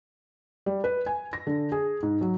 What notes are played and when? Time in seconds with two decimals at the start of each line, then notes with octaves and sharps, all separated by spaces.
0.66 G3
0.84 B4
1.06 G#5
1.33 A#6
1.47 D3
1.72 G#4
2.03 G#2
2.21 F#3